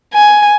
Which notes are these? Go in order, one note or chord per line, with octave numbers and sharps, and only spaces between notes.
G#5